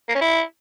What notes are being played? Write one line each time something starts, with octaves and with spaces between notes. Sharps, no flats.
A#3
C#4
E4